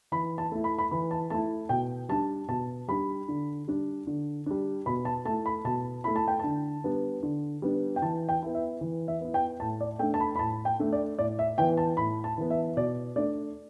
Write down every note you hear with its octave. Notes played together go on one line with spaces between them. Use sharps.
E3 B5
A5
A3 E4
B5
B5
E3 B5
A5
A3 E4 A5
B2 G5
G3 D4 A5
B2 A5
G3 D4 B5
D3
G3 D4
D3
G3 D4
B2 B5
A5
A3 E4 A5
B5
B2 A5
A3 E4 B5
A5
G5
D3 A5
G3 B3 D4
D3
G3 B3 D4
G5
E3 A5
G5
B3 E4
E5
E3
E5
B3 E4
G5
A2 A5
D5
A3 D4 G5
A5
B5
B5
A2 A5
G5
A3 D4
D5
A2 D5
E5
E3 B3 G5
A5
A2 B5
A5
E3 B3
E5
B2 D5
A3 D4 D5